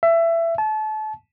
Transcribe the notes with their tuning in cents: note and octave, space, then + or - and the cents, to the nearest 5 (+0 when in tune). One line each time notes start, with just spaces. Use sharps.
E5 +20
A5 -30